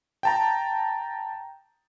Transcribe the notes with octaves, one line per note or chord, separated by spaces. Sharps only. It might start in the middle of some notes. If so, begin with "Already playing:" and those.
G5 A5 A#5